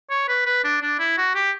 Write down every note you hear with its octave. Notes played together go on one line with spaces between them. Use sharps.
C#5
B4
B4
D4
D4
E4
F#4
G4